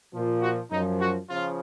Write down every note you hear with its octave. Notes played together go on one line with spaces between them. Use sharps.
A#2 F3
F#4
F#2 F3 D#4
F#4
C#3 F3 F4